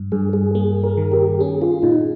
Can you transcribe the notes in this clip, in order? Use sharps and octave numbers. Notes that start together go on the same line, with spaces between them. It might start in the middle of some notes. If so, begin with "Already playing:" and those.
Already playing: G2
G2 G#4
G#4
A#3 G#4
A#4
D#3
G4
C#4 G#4
F4
A#2 D#4